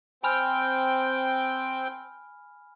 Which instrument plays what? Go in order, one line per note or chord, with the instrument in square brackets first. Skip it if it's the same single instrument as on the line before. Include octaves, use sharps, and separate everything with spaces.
[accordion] C4 G5 [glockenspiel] G#5 B5 F6